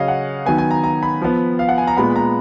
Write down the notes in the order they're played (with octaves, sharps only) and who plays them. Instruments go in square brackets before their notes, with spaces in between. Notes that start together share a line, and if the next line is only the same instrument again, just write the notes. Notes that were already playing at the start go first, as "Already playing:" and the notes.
Already playing: [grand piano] C#3 F#3 C#4 D#5 F5
F#5
D#3 F#3 B3 G#5
G#5
A#5
A#5
B5
F3 B3
F5
F#5
G#5
A#5
A#2 G#3 B3 B5
A#5